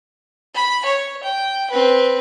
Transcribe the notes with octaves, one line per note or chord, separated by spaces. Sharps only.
B5
C#5
G5
C4 B4